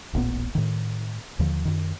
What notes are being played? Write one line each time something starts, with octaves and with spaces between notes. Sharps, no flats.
D1 A1 A#2 B3
A2 D#3
D#2 D3 F3
F#2 D#3